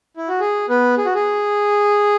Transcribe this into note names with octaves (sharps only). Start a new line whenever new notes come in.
E4
F#4
G#4
B3 B4
G#4
F#4
G#4